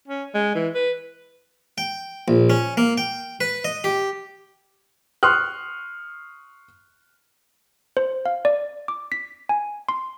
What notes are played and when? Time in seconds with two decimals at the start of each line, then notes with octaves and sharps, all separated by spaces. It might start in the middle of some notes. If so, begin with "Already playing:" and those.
0.08 C#4
0.35 G#3
0.55 E3
0.75 B4
1.78 G5
2.28 A#1
2.50 C#4
2.77 A#3
2.98 G5
3.41 B4
3.64 D#5
3.84 G4
5.23 C6 C#6 D#6 F6 F#6
7.97 C5
8.26 F5
8.45 D5
8.88 D6
9.12 B6
9.49 G#5
9.89 C6